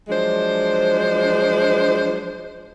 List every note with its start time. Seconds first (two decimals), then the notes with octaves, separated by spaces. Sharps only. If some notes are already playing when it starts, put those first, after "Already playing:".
0.09 F3 F#3 G#3 D4 C5